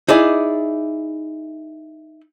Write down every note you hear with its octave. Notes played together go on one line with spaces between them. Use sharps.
D#4 E4 G#4 D5